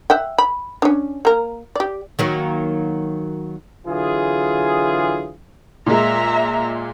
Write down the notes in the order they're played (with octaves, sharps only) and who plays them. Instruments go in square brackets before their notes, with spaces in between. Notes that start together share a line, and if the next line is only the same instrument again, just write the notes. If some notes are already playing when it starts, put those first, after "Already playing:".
[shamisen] E5 F#5 G5
B5
C#4 D4
A#3 A#4
G4 D5
[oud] D#3 F#3 A#3
[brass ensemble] D3 E3 F#3 F4 G#4
[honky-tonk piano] A#2 G#3 [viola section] E5 A#5